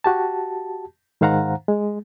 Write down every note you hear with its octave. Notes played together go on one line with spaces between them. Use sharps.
F#4 G4 A5
G#2 D#3 C5 F5 F#5 A#5
G#3